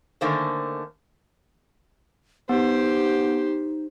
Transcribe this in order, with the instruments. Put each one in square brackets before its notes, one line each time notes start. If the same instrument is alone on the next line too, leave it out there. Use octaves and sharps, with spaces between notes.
[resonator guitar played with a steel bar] D3 D#3 A3 A#3 C#4 C5
[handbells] B3 [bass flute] D#4 [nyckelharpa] G4 C5